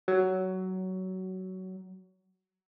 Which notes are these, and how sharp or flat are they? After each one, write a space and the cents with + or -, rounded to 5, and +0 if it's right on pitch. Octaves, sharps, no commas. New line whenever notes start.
F#3 +15